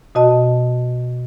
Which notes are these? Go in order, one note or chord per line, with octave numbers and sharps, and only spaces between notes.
B2 F#4 D#5 A5